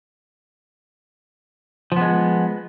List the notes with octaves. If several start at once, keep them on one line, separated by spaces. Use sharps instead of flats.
F3 G#3 B3